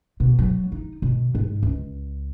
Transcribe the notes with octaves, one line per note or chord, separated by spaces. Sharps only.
B2
F#3
D#4
B2
G#2
C#2